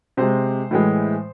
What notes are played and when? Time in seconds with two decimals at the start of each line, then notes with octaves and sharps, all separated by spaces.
0.17 C3 G#3 C5
0.71 A2 E3 G#3